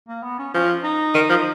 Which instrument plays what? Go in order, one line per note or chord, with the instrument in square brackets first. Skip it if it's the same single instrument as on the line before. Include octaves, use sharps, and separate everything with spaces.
[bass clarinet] A#3
B3
C#4
[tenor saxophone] F3 [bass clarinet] C#4
[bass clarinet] D#4
[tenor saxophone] D#3
F3